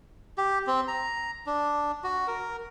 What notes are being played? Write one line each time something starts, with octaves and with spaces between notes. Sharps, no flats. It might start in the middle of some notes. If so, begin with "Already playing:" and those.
G4
C4
A#5
D4
F#4
A#4